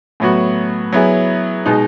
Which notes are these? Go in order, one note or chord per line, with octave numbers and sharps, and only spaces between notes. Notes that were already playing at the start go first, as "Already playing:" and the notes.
A2 F#3 B3 F#4
F#3 B3 E4 G#4
B2 G#3 D#4